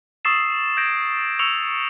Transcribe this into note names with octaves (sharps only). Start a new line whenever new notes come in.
C#6 D#6 E6 A6 C7 E7
G6 G#6 A#6 D7
C#6 E6 C#7 E7 F7